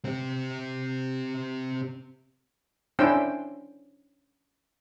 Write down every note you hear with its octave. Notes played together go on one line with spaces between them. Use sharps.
C4 G4
C#4 D4 E4 C5 G5 E6